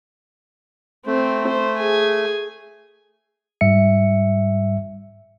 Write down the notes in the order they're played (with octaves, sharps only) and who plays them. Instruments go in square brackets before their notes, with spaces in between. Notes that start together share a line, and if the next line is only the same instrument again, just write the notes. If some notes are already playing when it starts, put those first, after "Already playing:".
[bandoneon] A3 [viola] C4
[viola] C5
G#4 G#5
[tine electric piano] G#2 G3 E5 C#7